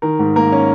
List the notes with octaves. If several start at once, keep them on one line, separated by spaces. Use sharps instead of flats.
D#3 A#4
G#2
A#3 A#4
C#4